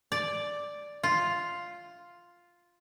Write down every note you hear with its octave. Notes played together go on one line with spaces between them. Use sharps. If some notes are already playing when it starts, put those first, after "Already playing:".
D5
F4